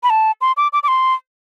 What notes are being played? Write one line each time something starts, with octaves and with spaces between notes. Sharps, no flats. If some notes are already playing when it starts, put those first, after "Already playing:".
B5
A5
C6
D6
D6
D6
C6